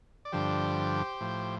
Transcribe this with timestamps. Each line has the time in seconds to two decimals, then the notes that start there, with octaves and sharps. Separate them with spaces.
0.25 D5
0.32 G2 D3 F3 G4 C5
1.21 A2 F3